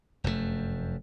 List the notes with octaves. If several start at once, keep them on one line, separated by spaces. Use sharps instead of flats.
F1 F#2 A#2 A3